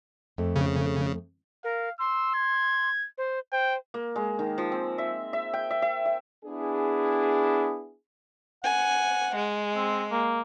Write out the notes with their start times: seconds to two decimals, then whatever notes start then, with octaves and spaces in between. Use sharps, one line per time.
0.38 F2 A3
0.56 C#3
1.64 A#4 F5
1.99 C6 E6
2.34 G#6
3.18 C5
3.52 C5 G5
3.94 A#3
4.16 G#3
4.39 D#3
4.58 F3
4.72 C4
4.98 E5
5.33 E5
5.53 G5
5.70 E5
5.82 E5
6.06 E5
6.44 B3 D4 E4 G#4
8.64 F#5 G#5
9.35 G#3
9.75 C4
10.11 A#3